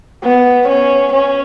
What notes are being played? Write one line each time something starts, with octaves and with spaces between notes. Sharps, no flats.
B3
C#4
C#4